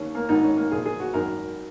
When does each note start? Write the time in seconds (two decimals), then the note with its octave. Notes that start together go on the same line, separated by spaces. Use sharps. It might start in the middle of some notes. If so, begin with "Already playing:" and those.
Already playing: D#2 D#3 C#4
0.15 A#3
0.29 G#1 G#2 D#3 D#4
0.43 C#4
0.57 A#3
0.71 A#1 A#2 G#4
0.86 G#4
1.00 F#4
1.14 G#1 F#2 D#3 A#4